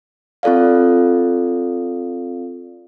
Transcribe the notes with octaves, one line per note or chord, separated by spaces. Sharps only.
C4 F4 A4 D5 F5